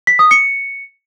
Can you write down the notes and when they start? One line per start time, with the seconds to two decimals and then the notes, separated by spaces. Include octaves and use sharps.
0.07 B6
0.19 D#6
0.31 C#7